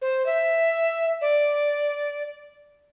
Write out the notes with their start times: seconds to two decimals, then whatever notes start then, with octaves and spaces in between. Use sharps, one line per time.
0.02 C5
0.26 E5
1.21 D5